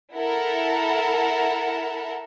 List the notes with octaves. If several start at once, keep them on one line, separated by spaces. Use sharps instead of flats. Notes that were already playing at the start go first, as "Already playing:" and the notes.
E4 A4 A#4 F#5